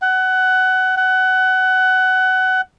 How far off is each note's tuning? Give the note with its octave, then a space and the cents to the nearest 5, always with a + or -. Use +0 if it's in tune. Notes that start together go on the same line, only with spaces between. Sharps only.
F#5 +20
F#5 +20